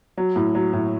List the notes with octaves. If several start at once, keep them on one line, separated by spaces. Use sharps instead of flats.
F#3
A2
F#3
A2